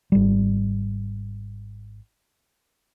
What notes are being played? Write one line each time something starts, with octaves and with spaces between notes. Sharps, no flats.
G#1 G3